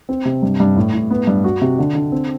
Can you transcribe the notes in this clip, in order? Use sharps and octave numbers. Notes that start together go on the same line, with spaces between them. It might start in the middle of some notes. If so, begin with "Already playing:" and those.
C4
C3
G2
G2
A2
A2
B3
G2
F#4
C3
D3
D3
C4